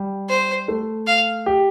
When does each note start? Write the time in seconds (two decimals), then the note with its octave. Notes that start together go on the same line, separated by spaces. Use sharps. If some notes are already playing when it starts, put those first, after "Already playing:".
Already playing: G3
0.29 C5
0.68 A3
1.07 F5
1.46 G4